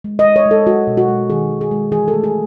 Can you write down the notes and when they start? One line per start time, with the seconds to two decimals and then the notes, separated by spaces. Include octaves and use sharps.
0.04 G#3
0.19 D#5
0.25 G#3
0.36 C#5
0.46 G#3
0.51 A4
0.66 G#3 F#4
0.87 B2
0.97 F#4
1.08 G#3
1.30 D#3 G#4
1.50 D#3
1.61 G#4
1.71 G#3
1.92 E3 G#4
2.08 A4
2.14 A3
2.24 G#4